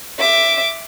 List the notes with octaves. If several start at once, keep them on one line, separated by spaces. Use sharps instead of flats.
E5 D6